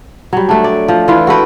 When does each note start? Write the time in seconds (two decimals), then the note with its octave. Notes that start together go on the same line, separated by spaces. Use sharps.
0.33 F#3 G3
0.49 A3 D4
0.64 D5
0.88 F3
1.08 E3 F4 B4
1.27 F#4 A4 B4 G5